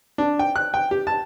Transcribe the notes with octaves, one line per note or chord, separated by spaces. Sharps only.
D4
G5
F#6
G5
G4
A5